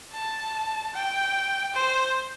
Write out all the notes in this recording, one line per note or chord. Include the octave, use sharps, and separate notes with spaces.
A5
G5
C5